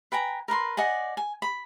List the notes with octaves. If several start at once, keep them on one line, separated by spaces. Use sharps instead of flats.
B4 G5 G#5 A#5
A#4 B4 A#5 C6
D5 D#5 F#5 G#5
G#5
B5